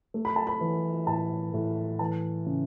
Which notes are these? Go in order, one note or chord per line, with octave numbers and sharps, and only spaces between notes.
A3
B5
A5
B5
E3
A2 A5
A2
E3 A5
C#3